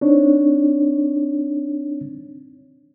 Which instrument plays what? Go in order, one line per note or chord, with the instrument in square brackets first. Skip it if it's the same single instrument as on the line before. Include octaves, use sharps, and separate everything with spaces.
[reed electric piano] C4 D4 D#4 C#5